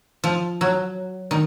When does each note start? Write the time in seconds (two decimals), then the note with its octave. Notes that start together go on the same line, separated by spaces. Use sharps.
0.24 F3
0.61 F#3
1.31 D#3